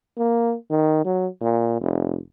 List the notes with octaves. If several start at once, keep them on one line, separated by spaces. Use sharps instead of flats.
A#3
D#3
F#3
A#2
F1